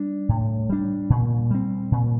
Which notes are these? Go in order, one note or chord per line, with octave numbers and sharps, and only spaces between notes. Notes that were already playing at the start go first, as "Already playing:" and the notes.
Already playing: G3 D4
A2
G3 D4
A#2
G3 C4
A#2